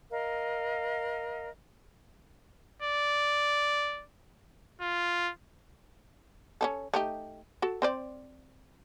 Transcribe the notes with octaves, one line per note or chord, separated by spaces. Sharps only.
A#4 D#5 F5
D5
F4
C#4 D#4 A4
A3 D#4 G4
F#4 A4
C4 C5 D5